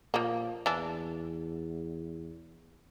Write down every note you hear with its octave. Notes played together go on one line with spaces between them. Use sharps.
A#2 F3 A#3
E2 E3 D4